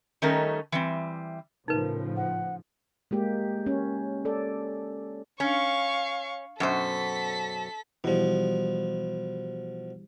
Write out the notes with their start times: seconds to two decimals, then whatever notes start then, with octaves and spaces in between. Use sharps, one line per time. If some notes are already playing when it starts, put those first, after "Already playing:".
0.22 D#3 G3 A3 C#4 D#4 A#4
0.72 E3 G3 C4
1.68 A2 C#3 F3 D#4 A#4 B4
2.16 F#5
3.11 G#3 A#3 G4
3.66 C#4
4.25 A4 D5
5.40 C#4 F5 C#6
6.60 F#2 B2 A4 C5 B6
8.04 B2 E3 F3 G3